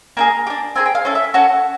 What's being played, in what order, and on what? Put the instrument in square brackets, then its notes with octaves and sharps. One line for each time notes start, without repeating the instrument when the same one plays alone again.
[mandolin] A#3 D#4 G#4 A#5
G4
D4
C4 D#4 G#4 G#5
G5
F5
C#4 E4 A4
E5
C#4 F#4 A4 F#5